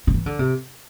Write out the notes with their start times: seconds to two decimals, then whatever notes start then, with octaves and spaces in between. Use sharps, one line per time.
0.07 D3
0.14 E3
0.26 D3
0.39 C3